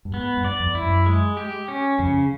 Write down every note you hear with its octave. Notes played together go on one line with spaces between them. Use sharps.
G2
G#2 B3
G2
D5
F2
E4
F#2
G#3
G4
C#4
F2 C#3